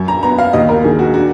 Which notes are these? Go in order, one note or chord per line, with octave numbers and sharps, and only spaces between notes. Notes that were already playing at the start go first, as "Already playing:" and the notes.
Already playing: F#2
A#5
B3 A#5
F5
D#2 D#5
A#4
D#3 G#4
F#4
D4 F#4